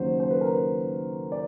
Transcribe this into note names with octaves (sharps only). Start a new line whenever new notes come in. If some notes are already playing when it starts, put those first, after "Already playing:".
Already playing: D#2 C#3 F#3 C5
C5
B4
A#4
B4
D5